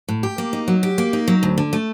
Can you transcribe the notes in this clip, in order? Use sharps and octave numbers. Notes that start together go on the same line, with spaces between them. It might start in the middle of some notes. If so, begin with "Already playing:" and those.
A2
G4
A#3
D#4
F#3
G4
A#3
D#4
F#3
D2
D3
A3